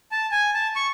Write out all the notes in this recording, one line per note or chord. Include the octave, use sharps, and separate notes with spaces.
A5
G#5
A5
C#6